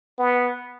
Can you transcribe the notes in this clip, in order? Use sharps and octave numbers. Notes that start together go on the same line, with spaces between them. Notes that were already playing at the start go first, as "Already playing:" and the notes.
B3